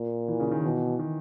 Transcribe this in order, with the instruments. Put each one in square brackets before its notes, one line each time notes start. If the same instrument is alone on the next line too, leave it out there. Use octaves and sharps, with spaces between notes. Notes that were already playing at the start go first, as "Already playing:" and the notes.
Already playing: [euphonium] A#2
[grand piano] E3
C#3
D#3
[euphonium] B2 [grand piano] E3
[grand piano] D#3